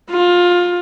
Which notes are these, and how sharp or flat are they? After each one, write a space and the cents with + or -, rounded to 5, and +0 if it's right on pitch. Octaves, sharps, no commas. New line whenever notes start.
F4 +20